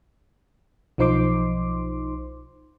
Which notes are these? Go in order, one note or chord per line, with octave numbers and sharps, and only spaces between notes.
B1 F3 D#4 C5 C6 D6